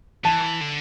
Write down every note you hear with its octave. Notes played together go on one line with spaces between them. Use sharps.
E3 A5
D3